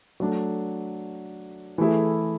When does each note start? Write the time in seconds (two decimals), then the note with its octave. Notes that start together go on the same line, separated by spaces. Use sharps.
0.20 F#3 A3 D4
1.78 E3 A3 E4 G#4